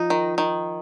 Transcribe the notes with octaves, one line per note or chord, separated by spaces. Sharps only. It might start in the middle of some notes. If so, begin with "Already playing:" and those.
Already playing: F3 D#4
D#3
D#3